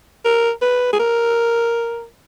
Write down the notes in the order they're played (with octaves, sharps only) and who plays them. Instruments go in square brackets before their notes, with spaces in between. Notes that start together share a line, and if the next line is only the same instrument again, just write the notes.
[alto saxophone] A#4
B4
G#4
A#4